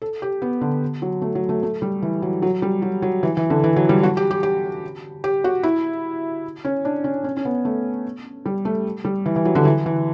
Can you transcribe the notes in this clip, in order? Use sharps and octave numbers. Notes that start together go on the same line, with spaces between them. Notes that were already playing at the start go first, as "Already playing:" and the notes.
A4
G4
B3
D3
F#3
A3
F#3
A3
A3
G3
E3
F#3
F#3
G3
F#3
F#3
E3
E3
D3
E3
F#3
G3
F#4
G4
G4
G4
G4
F#4
E4
C#4
D4
C#4
C#4
C#4
B3
A3
G3
A3
G3
E3
E3
F#3
D3
E3
E3